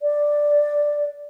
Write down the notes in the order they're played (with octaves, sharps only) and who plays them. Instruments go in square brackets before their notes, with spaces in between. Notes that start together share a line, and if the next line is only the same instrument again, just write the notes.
[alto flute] D5